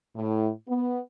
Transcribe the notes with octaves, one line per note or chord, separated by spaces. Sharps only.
A2
B3